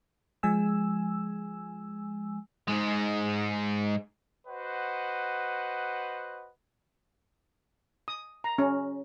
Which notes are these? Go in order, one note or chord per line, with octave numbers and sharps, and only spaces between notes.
F3 G#3 G#5 E6
G#2 G#3
F#4 B4 C5 D#5 F#5
D#6
A#5
C#4